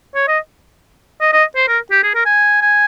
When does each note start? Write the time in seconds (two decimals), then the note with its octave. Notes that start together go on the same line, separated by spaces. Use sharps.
0.15 C#5
0.28 D#5
1.21 D#5
1.33 D#5
1.55 C5
1.68 A#4
1.91 G4
2.03 G#4
2.15 A#4
2.26 G#5
2.62 G#5